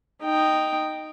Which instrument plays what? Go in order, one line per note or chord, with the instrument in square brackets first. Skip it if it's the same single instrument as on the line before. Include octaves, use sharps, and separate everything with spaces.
[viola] D#4 G5